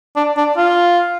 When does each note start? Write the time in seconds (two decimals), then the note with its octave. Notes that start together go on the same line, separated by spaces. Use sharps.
0.16 D4
0.37 D4
0.57 F4